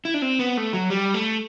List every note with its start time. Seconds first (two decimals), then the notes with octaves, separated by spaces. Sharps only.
0.05 E4
0.14 D4
0.22 C4
0.39 B3
0.57 A3
0.73 F#3
0.90 G3
1.14 A3